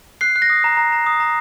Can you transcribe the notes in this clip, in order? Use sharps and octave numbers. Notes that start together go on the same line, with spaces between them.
F#6 C7
F#6
A#6
D#6
A#5
A#5
A#5
D#6
A#5